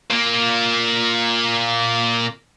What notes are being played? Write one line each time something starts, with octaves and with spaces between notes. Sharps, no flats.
A#2 A#3